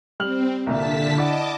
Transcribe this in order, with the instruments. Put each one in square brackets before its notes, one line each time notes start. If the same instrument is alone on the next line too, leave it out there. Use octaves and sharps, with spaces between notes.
[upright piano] G3 F6 F#7 [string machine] C4
[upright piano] C2 A#2 E5 [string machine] D3 A5 B6
[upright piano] E4 D5 F#5 [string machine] D#5 A5 D6